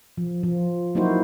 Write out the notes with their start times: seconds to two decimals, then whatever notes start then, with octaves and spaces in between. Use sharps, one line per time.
0.17 F3
0.43 F3
0.95 F#3 A#3 D#4 E4 F#4 C5